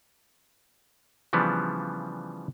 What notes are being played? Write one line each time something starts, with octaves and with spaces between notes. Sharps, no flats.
C#3 E3 F3 G3 B3 D4